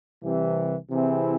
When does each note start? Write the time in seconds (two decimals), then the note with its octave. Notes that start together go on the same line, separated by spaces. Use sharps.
0.21 C2 C3 E3
0.89 C3 E3 C4 E4 G#4